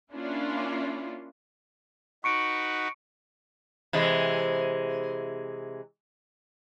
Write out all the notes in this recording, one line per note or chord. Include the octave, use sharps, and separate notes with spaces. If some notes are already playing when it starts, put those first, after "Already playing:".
A#3 C#4 D4 E4 F4
D#4 F#4 B4 C#6 C#7 D7
C3 E3 G#3